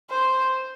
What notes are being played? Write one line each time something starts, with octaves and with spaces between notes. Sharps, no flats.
C5